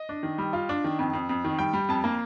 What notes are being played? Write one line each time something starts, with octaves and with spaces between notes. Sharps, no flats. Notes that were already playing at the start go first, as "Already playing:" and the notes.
Already playing: D#5
D4
D#3
G3
F4
D4
D#3
F2
F2
F2
D#3
G3 G5
G3
F2 A5
A#3